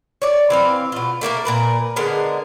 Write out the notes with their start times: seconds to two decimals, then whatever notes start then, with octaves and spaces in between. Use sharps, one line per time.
0.22 C#5 D5
0.50 E3 C4 F5
0.92 B2 F4
1.21 A3 A#3 D4 A#4
1.45 A#2 A#4 B4
1.96 D3 G#3 B3 A#4